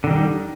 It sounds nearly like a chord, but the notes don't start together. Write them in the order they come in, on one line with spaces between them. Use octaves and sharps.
D3 D#3 G3